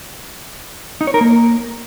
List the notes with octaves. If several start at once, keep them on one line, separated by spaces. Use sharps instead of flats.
D#4
C#5
A#4
A#3